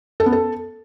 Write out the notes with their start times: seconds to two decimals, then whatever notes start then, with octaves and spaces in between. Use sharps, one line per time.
0.20 A4
0.26 B3
0.32 A4